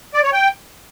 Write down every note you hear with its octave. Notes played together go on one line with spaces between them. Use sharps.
D5
C#5
G5